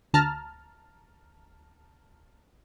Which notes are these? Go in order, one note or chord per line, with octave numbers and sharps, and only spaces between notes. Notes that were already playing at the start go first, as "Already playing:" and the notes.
D2 A5 A#5 F6